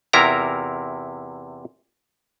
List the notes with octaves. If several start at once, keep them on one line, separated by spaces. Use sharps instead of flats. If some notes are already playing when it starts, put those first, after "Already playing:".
E2 C3 E4 F4 A#4 A#5